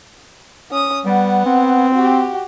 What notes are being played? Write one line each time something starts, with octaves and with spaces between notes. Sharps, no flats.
C#4 D#6
G3 B3 F#5
C4
F#4 G4